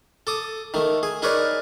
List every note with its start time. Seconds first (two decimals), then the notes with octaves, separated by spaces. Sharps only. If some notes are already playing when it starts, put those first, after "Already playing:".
0.27 A4 D6 D#6
0.74 D#3 A3
1.03 G#4
1.22 D#4 G#4 A#4 B4 C#5 D5